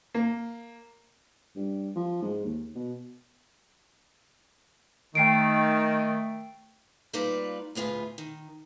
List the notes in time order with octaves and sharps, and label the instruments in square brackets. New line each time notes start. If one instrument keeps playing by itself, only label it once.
[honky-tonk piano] A#3
[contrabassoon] G2
F3
G#2
D#2
B2
[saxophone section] D#3 [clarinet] A3 [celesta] G5 C7 D7
[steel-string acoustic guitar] G3 A#3 D#4 F4 B4 D5
D2 A2 B3 F4 G#4
D#3